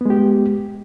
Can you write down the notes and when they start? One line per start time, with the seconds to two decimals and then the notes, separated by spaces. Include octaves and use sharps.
0.01 B3
0.05 G#3
0.10 G4